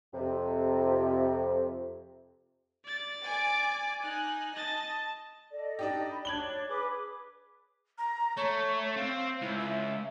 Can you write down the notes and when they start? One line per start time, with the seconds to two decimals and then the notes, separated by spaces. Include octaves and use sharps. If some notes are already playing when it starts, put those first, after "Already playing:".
0.14 F2 C3
2.85 D5 A6
3.22 G#5 D6
4.02 D#4 G#5 F#6
4.54 D#5 A5 A6
5.51 A4 D5 D#5
5.79 D4 D#4 G4
6.09 B5
6.25 D4 C#5 G#6 F#7 G7
6.67 G#4 B4 D6
7.98 A#5
8.37 A3 C#5
8.96 C4 F5
9.41 C#2 E4
9.59 E5